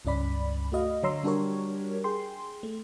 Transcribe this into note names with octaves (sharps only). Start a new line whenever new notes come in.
C#2 G2 C#4 D5 B5
A3 F#4 D#5 F5
D3 F#3 C#5 A#5 C6 E6
G3 D4 F#4 G4 A#4 C#5
G#4 G5 C6
A3